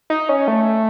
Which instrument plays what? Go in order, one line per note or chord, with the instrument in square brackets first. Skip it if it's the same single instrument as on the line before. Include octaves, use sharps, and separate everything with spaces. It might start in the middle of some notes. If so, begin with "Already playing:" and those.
[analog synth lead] D#4
C#4
A3